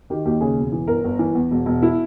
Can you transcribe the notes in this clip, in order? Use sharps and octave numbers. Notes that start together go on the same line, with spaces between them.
D#3 G4
D#2 G4
C#3 G#4
E1
E3
G1 A#4
G1
E3
E2
E1
E1
E4